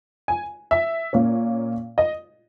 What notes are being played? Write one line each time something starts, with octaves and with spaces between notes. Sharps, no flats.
G#5
E5
A#2 A#3 C#4
D#5